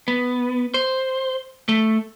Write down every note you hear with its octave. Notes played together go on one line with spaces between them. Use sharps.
B3
C5
A3